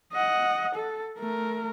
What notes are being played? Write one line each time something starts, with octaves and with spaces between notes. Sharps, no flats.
D#5 F#5
A4
A3 A#4